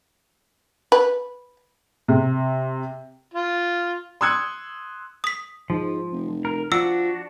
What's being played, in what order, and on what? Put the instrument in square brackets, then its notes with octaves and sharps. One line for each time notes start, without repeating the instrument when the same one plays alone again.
[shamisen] B4
[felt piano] C3
[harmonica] F4
[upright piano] C6 D#6 E6 F#6 G#6 C#7
[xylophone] D#6 B6
[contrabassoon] G#2 [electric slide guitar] F3
[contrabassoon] F1
[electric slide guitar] A#4
[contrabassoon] F3 [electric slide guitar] D4 F#4 [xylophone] E6